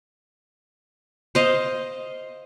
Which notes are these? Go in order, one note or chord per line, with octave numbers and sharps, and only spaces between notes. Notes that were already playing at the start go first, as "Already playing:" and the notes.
C5 D#5 F5